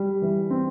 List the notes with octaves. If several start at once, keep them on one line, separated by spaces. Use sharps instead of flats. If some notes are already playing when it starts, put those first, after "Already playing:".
Already playing: G3
E3
C4